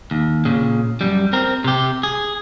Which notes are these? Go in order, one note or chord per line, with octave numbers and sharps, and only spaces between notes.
D#2
A#2 C#3
F#2 G3
C4 A#4
C3 G4
G#4